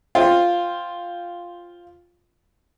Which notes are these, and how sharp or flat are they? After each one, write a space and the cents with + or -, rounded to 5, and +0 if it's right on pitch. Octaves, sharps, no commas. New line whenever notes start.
F4 +0 C5 +0 G5 +10